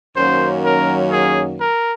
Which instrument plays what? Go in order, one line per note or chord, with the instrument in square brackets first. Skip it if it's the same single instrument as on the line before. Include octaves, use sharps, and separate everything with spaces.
[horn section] F#2 D#3 F#3 A#3 C#4 C5
A#4
G#4
A#4